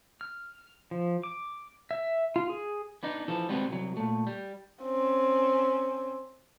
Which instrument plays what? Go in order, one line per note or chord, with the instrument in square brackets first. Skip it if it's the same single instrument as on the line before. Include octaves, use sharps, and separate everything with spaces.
[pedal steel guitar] F6
F3
D6
E5
F4
G#4
[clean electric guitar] B3 D4 D#4
E3 F3 A4
G3 G#3 B3 C4 F#4
C2 F#3
A#2 A3
G3
[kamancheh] C4 C#4